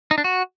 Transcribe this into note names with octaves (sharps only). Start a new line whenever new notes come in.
D#4
D4
F#4